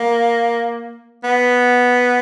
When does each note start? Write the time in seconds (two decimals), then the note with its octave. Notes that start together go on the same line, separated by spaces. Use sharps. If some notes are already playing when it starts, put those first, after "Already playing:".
Already playing: A#3
1.24 B3